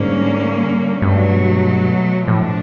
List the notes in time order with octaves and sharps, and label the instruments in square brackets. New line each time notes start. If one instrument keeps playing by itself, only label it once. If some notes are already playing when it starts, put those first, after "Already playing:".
Already playing: [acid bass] G#2 [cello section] D3 G3 A#3 C#4
[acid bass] G2 [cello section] B2 F#3 A3
[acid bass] A2 [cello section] F3 A3 D4